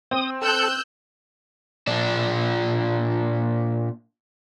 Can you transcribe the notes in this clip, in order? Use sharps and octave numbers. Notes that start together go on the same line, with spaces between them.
C4 D#6
A4 E6 F#6 G6
A#2 D4